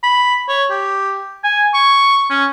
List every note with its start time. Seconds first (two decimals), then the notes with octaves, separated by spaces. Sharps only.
0.04 B5
0.49 C#5
0.70 G4
1.44 G#5
1.74 C#6
2.30 C#4